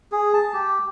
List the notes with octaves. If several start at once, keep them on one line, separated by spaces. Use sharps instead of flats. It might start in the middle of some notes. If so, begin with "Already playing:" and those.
G#4
A5
G4